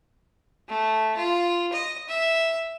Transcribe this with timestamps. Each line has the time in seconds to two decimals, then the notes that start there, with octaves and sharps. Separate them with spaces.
0.69 A3
1.17 F4
1.73 D#5
2.09 E5